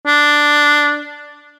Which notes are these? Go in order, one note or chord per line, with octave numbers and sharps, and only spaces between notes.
D4